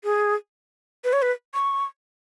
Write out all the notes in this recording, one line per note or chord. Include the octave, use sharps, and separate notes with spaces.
G#4
B4
C#5
B4
C#6